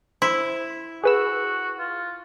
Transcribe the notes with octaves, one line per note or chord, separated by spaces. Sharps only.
E4 C5
F#4 G#4 B4 E6
F4